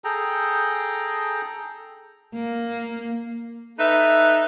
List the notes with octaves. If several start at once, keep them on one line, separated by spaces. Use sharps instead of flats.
G#4 A4 G5 A#5
A#3
D#4 A4 B4 E5